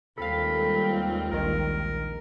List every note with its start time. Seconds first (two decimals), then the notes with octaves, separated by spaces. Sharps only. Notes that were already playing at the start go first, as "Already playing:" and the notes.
0.18 D#2 G3 G#3 C4 F4 A4 F5 B5
1.31 A#1 D#3 A#4